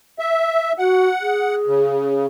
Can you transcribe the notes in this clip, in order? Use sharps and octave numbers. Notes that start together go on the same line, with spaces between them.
E5
F#4 F#5
G#4
C#3